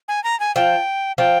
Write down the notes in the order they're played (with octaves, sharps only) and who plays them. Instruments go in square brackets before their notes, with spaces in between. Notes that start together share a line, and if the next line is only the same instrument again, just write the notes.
[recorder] G#5
A#5
G#5
[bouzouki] F3 [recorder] G5
[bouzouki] F3 [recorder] G5